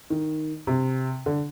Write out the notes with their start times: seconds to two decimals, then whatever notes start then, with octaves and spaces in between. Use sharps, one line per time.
0.10 D#3
0.67 C3
1.26 D3